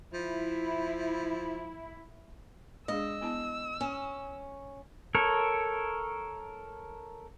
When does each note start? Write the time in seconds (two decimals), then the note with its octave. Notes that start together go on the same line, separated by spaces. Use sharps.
0.13 F3 E4
2.88 G#3 D4 G#4 D#5 E6
3.21 B3 E4 A5
3.81 C#4
5.15 A4 A#4 C#5